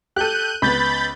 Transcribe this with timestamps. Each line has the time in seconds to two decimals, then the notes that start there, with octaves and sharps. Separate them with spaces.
0.16 G4 A4 F#6 G6 D#7
0.62 C#2 B3 B5 G6 A6